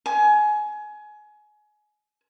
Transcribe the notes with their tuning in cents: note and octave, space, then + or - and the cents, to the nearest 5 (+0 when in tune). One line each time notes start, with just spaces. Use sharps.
G#5 +25